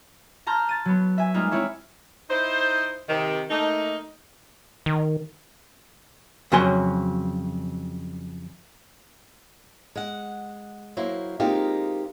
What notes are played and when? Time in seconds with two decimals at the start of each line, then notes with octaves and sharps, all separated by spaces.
0.46 A5 A#5 C6 F6 G6
0.69 A6 D#7
0.85 F#3 B3
1.18 E5 G#5
1.34 G3 G#3 A#3 D#4 F4
1.51 A#3 C4 E4 C#5 E5
2.29 D#4 E4 C5
3.08 C3 D#3
3.49 A3 A#3 D#4
4.86 D#3
6.52 F2 C#3 F#3 F#4 G#5 C6
9.95 G#3 F#5
10.97 F#3 A#3 E4 C5
11.40 G#3 A#3 C4 D#4 F4 G4